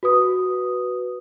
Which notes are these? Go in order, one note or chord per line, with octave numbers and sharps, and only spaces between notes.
F#4 B4 D#6